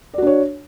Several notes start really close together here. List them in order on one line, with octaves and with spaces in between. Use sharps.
D5 F#4 D4 C#5